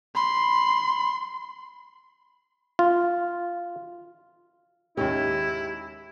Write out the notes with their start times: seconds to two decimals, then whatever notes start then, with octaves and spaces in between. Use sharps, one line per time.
0.16 B5 C6
2.79 F4
4.97 D#2 G#2 C#4 E4 G4 D#5